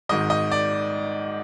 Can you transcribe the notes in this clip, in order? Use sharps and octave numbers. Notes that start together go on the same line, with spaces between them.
G#1 G#2 D#3 D#5
D#5
D5